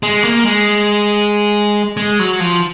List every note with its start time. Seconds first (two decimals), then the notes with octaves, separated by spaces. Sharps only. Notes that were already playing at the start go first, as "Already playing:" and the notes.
0.03 G#3
0.24 A#3
0.45 G#3
1.97 G#3
2.19 F#3
2.40 F3